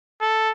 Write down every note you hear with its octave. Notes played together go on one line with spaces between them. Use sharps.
A4